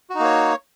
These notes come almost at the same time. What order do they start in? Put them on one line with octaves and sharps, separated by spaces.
F#4 D#4 A#3 C#5